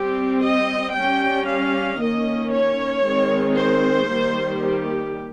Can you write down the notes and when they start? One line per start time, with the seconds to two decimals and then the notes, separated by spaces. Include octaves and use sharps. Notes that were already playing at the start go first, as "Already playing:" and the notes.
Already playing: G3 C4 G4
0.42 D#5
0.94 G3 C#4 G5
1.46 F5
2.00 D#3 A#3 C#4 D#5
2.52 C#5
3.04 D#3 G#3 C4
3.57 C5
4.09 D#3 G3 A#3
4.62 G4